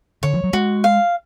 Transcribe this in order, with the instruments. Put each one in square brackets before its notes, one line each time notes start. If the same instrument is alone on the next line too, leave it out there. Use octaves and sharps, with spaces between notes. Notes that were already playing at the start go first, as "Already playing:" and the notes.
[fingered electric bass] D3 [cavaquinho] C#5
[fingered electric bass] F3
F#3
[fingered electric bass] G#3 [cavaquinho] F#4
[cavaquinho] F5